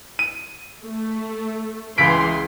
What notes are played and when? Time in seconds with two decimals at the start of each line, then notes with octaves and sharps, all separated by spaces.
0.19 D#7
0.84 A3
1.98 C#2 E3 G#4 C6 B6 D7